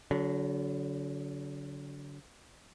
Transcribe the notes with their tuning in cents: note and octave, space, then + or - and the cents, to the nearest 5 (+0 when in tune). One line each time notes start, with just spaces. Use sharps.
D3 -35 F#3 +0